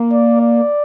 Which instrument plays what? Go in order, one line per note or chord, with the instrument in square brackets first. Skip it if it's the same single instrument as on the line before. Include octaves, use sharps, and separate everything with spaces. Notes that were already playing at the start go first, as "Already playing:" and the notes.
Already playing: [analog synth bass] A#3
[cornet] D5
D5